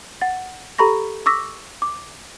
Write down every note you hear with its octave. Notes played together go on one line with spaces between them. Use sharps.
F#5 A6
G4 A4 A#5 B5 C#6 A#6
C#6 D6 E6 A#6 B6
D6